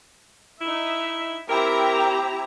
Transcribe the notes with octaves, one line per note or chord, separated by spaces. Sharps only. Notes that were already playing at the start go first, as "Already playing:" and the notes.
D#4 E4 E5
C4 E4 G4 A#4 A#5